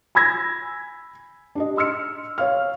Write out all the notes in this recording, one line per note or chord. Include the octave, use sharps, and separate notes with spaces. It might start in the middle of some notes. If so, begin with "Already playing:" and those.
G#5 B5 E6 G#6 A#6
D4 G4 D#5
C6 E6 F6 C#7
C#5 F5 F6